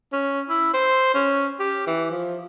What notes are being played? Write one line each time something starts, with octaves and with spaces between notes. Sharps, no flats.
C#4
E4
C5
C#4
G4
E3
F3